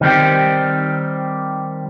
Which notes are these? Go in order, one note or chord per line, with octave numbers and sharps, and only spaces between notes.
D#3 G3 C4 G4